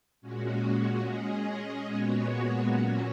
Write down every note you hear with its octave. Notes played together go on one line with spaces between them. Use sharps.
A#2 G#3 C#4 F#4
G#3 C#4 G#4 D#5
A#2 G#3 B3 F#4 C#5
A#2 F#3 C#4 F#4